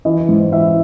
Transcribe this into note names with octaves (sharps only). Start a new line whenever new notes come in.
E3 D#5
G#2
E3 E5